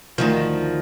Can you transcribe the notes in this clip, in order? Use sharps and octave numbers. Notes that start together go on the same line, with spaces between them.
D2 D#3 F3